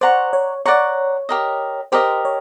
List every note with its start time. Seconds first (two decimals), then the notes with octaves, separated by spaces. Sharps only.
0.01 C5 D5 F#5 A#5 C#6
0.33 C#5
0.65 C#5 D5 F#5 A#5 C#6
1.29 G4 A#4 D#5
1.92 G4 A#4 C5 D#5
2.25 C#5